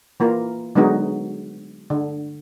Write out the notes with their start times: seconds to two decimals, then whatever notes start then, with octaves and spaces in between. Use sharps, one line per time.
0.20 E3 A#3 F4 A#4
0.75 D3 F#3 G#3 B3 D#4 F#4
1.90 D3